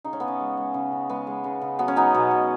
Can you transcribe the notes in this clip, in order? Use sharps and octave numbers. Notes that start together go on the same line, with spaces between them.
C#3 D#4
C#4
C#3 B3
C#4
G#3
G#3
C#3
C#3
G#3 B3
G#3
C#3
C#3
F#3 B3
C#4
F#3 B3 D#4
B2
B2